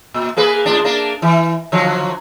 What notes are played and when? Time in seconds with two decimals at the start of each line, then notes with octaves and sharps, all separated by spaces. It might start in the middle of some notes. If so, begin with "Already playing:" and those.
0.14 A#2
0.37 A#3 G#4 B4
0.66 A2 D4
0.84 A#3 D4
1.22 E3
1.72 D3 F3 F#3